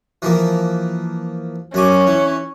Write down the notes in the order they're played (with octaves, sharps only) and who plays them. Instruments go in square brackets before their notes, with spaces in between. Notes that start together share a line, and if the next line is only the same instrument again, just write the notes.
[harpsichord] E3 F3 A#3
[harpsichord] F#2 G#5 D6 [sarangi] C#4
[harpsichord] E3